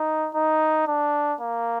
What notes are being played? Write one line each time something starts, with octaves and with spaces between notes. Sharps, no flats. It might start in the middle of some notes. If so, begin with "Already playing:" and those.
Already playing: D#4
D#4
D4
A#3